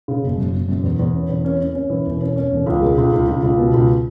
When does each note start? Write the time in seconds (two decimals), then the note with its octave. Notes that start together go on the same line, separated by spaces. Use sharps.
0.08 C#3
0.23 F#1
0.37 F#2
0.53 F#1
0.69 F#2
0.83 E2
0.99 E2
1.14 C#4
1.29 E2
1.45 C#4
1.60 C#4
1.75 C#4
1.90 E3
2.06 E1
2.21 C#4
2.36 C#4
2.52 E1
2.66 C#2
2.82 G#3
2.98 C#2
3.13 C#2
3.28 C#2
3.43 C#2
3.58 B2
3.74 C#2